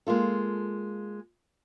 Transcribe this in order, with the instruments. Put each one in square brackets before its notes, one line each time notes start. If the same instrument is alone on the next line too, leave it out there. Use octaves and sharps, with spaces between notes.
[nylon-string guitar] G#3 A#3 F4 A4